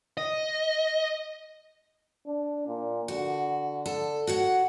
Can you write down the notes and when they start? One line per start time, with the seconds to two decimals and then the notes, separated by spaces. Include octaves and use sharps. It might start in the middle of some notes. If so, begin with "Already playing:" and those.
0.17 D#5
2.27 D4
2.67 A#2
3.08 D3 F#4
3.86 A4
4.27 F#4 C#5 F#5